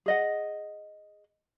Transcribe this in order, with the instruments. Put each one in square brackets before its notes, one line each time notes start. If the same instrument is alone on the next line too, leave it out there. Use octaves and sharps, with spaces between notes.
[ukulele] G#4 D#5 F#5